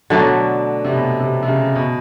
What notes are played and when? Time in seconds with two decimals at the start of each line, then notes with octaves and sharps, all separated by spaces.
0.10 B2 D3 F#3 A3 D4
0.84 C3
0.93 B2
1.20 C3
1.43 C3
1.48 C#3
1.75 B2